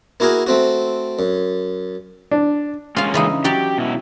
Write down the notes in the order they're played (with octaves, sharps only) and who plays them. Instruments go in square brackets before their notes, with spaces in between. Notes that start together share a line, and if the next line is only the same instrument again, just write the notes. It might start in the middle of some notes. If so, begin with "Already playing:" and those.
[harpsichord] A#3 E4 F#4 G#4 A#4
A3 C4 F#4
F#2
[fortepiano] D4
[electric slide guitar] G#3 A#3 C#4 [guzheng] F4 F5
[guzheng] C#3 E3 D#4
[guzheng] F#3 F#4 D5 [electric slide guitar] G4
[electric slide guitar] B2 E4